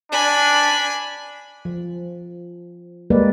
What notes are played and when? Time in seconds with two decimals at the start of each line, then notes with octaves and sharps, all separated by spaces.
0.12 D4 G#5 B5
1.65 F3
3.10 G3 G#3 A#3 B4 D5